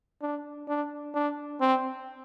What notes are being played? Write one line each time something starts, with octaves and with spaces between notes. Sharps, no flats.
D4
D4
D4
C4